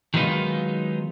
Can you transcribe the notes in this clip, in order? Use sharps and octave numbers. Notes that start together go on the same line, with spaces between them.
D#3 F#3 G#3 B3 D#4 F4